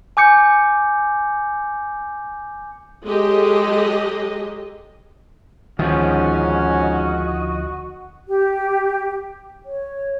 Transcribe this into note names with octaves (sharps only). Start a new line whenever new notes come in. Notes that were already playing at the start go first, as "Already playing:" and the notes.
G#5 D6 G6 C#7
F#3 G#3 G4 A4 D#5
D2 G#2 D#3 F3 C#4 F#4 D#5
G4
C#5